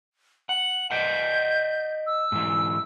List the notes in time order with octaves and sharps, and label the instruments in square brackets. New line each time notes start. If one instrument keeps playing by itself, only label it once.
[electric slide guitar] F#5 [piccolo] F#7
[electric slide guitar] D5 D#5 F#5 [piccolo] G6
[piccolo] E6
[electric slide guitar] G#2 E3